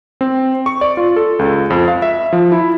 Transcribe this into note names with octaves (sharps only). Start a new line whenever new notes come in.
C4
C#6
D5
F4
A4
C#2
F2
F5
E5
F3
E4